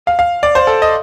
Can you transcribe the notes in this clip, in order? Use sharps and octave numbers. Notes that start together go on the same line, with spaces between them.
F5
F5
D5
C5
A4
D#5